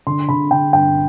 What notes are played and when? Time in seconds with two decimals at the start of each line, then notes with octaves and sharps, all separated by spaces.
0.07 D3 C6
0.29 D3 B5
0.51 D3 G5
0.73 G1 G5